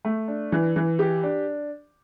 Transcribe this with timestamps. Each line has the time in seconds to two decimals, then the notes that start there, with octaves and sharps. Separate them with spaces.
0.05 A3
0.28 D4
0.52 E3
0.76 E3
0.99 G4
1.23 D4